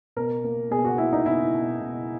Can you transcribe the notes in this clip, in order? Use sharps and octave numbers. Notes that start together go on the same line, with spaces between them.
B2 A#4
A#3
B2 G#4
F#4
A#3 E4
D#4
B2 E4
B2
B2